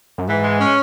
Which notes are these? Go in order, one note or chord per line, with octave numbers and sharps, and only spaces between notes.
F#2
G#2 E3
G#3
C#4